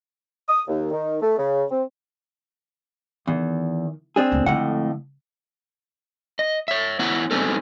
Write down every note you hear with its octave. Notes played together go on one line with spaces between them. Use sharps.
D#6
D#2
D#3
A3
C#3
C4
E2 D#3
C4 D4 G#4
D#1 D2
F2 A2 D3 G#3 F#5
D#5
C#5 E5
B3 E4 C#5 F#5
G3 B3 C4 D#4 G#4 A4